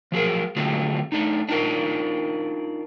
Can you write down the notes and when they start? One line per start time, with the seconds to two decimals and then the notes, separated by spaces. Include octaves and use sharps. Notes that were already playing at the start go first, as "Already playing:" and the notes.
0.12 F3 F#3 G#4 A#4
0.56 D3 F#3 G#3 A3 C4 F4
1.12 A3 D4 D#4
1.49 D4 D#4 F4 A#4